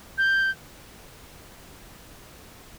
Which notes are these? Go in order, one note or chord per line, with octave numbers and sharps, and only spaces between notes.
G6